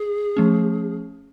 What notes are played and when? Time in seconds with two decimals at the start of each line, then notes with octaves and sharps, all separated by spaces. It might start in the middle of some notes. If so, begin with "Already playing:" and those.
Already playing: G#4
0.37 F3 A3 C#4